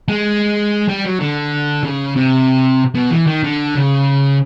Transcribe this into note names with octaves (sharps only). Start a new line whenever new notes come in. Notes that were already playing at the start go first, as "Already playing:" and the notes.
G#3
G3
F#3
D3
C#3
C3
B2
E3
D#3
D3
C#3